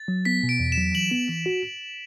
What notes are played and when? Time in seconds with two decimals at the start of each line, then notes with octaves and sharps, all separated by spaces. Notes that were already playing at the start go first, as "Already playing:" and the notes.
Already playing: A6
0.08 F#3
0.25 B3 B6
0.43 B2
0.49 D7
0.60 E2
0.72 E7
0.78 F#3
0.95 E3 F#7
1.11 B3
1.29 E3
1.46 F#4